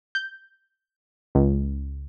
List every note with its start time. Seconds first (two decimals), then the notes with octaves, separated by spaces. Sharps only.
0.15 G6
1.35 C#2